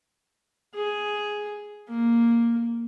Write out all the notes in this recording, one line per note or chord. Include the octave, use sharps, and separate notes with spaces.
G#4
A#3